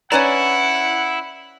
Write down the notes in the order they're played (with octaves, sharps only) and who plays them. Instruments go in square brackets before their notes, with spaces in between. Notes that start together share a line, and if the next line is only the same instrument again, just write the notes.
[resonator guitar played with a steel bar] C#4 B4 D5 [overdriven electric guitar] E4 [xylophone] C#5 A#5 [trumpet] F#5